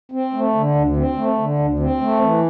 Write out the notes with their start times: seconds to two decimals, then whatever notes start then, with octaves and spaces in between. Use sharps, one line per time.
0.12 C4
0.34 A3
0.55 D3
0.75 D2
0.96 C4
1.17 A3
1.38 D3
1.59 D2
1.80 C4
2.01 A3
2.21 E3